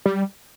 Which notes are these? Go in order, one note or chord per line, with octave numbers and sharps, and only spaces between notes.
G3